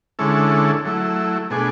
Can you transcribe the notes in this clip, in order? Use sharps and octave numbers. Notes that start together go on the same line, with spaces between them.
D3 G#3 C#4 E4 A4
F#3 A3 E4
B2 A3 D4 G#4